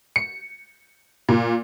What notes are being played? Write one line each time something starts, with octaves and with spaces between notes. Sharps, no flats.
C#7
A#2